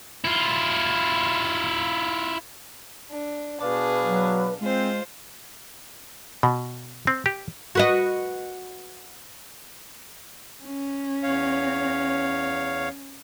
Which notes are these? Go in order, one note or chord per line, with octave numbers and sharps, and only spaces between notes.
E4 F4
D4
B2 D4 G#4 B4 F5 A5
F#3
G#3 C4 F4 C5
B2
C4
G4
F#4 B4 D#5
C#4
E2 C#5 F5